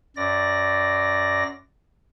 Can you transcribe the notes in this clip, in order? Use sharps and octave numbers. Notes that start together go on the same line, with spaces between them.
F#2 D5 A#6